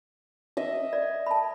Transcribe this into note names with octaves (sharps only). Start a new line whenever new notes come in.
D#5 E5
D5
A5 B5